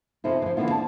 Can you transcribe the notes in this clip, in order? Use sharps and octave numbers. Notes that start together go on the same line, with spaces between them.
F2 C3 D#3 F3 E4
E3 F3
D3 E3 A#3 B3 E4 F4
A5